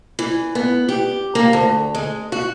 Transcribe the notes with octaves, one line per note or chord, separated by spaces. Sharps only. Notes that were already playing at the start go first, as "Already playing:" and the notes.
E3
B3
G4
A#3
D2
G#3
F#4